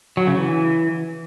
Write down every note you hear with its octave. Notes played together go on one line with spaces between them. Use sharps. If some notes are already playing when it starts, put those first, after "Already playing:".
F#3
C#3
E3